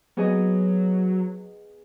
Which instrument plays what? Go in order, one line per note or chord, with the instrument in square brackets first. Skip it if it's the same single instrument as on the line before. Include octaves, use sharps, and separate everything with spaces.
[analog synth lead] F#3 [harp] B3 G#4 D#5